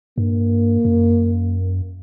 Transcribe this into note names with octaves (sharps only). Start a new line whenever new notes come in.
G2 A#3
F#2